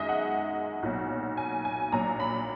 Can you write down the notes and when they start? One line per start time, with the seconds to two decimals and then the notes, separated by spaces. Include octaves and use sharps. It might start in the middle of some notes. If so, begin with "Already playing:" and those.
Already playing: F#2 D#3 G#3 D#5 E5
0.09 F#5
0.83 B1 A#2 F#3
1.37 G#5
1.65 G#5
1.92 A#1 A#2 F#3 A#5
2.20 B5